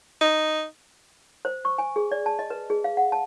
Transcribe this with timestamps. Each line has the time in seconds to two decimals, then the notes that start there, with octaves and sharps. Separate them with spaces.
0.21 D#4
1.45 C5
1.65 C#6
1.78 G#5
1.96 G#4
2.11 D5
2.26 A5
2.39 D#5
2.50 B4
2.70 G#4
2.84 F5
2.97 F#5
3.12 A5